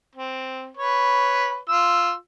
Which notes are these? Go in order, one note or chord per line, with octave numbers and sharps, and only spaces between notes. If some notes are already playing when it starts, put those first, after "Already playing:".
C4
B4 C#5
F4 E6